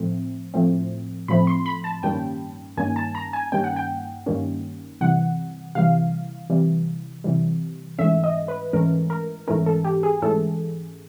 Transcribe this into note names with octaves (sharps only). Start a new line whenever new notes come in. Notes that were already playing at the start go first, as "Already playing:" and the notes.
Already playing: A2 F3 A3 C4
A2 F3 A3 C4
A2 F3 A3 C4 B5
C6
B5
A5
G2 D#3 G3 A#3 C#4 G5
G2 D#3 G3 A#3 C#4 G#5
A5
A#5
G#5
G2 D#3 G3 A#3 C#4 G5
F#5
G5
G2 D#3 G3 A#3 C#4
C3 E3 G3 F#5
C3 E3 G3 F5
C3 E3 G3
C3 E3 G3
G#2 E3 A3 C#4 E5
D#5
B4
G#2 E3 A3 C#4 A#4
A#4
G#2 E3 A3 C#4 A#4
A4
G4
G#4
G#2 E3 A3 C#4 A4